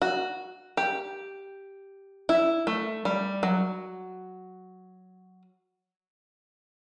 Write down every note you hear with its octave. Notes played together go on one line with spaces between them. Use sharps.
F#4
G4
E4
A3
G3
F#3